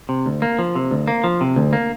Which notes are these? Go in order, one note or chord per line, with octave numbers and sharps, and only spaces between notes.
C3
D2
A#3
F3
C3
D2
A#3
F3
C3
D2
A#3